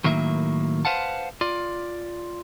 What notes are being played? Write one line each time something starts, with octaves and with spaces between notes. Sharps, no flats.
A2 D#3 F#3 A#3 E5
B4 C5 F5 F#5 A5
F4 D5